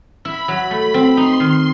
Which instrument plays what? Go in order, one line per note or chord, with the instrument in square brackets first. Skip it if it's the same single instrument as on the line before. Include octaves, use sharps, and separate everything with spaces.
[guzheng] E4 [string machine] B5
[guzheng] F#3
A3
C4
[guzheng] D#4 [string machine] C6
[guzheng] D#3